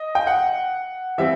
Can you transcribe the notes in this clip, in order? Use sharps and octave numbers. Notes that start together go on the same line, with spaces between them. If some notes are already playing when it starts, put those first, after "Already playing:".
Already playing: D#5
G5
F#5
E3 G3 C4 E5